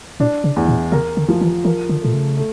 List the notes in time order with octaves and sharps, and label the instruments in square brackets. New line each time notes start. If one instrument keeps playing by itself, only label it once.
[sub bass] A#2 [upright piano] D4
[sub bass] C#3
[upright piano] E2
[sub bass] A#2
[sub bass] C#3 [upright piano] A#4
[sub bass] D3
[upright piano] F3
[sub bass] E3
[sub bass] E3 [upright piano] A#4
[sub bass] D3
[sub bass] A#2 [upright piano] A3
[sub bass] C#3
[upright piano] A3